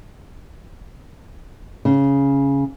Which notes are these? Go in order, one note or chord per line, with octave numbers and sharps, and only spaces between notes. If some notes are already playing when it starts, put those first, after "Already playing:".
C#3